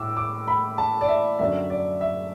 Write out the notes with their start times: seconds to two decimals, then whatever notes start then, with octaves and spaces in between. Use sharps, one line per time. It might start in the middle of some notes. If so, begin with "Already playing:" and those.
Already playing: A2 D6 E6
0.17 D6
0.48 B5
0.78 A5
1.01 D5
1.08 E5
1.39 F#2 D3 F#3 D4 E5
1.70 D5
2.01 E5